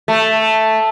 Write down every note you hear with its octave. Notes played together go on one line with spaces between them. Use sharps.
A3